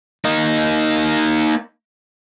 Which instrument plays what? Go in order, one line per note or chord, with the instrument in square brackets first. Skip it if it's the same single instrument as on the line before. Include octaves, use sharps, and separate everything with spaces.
[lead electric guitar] A#3 D#4